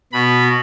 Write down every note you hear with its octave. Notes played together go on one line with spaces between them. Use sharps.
B2 B5